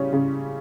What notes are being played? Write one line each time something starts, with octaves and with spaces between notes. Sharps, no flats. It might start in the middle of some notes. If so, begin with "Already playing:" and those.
Already playing: C#3 G3 C#4
C#3